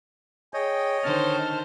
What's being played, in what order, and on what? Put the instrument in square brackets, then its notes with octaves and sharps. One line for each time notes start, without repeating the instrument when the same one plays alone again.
[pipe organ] G#4 G5 [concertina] C#5 D#5
[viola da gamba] D3 D#3 C5 [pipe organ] A5 F6